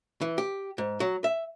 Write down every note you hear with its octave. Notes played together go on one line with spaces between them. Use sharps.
E3
G4
G#2
F#3
E5